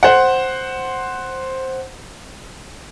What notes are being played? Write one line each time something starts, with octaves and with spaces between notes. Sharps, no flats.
C5 F#5